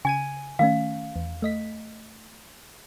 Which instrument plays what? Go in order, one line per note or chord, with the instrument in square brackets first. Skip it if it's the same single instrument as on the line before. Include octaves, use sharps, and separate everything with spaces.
[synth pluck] C#3 G#6 D#7 [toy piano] G#5
[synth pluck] D#3 A3 C#4 [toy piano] F5
[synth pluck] E2
A3 D#5 B6